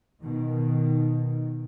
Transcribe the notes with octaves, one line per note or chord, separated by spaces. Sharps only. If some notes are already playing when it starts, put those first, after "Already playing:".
B2 D#3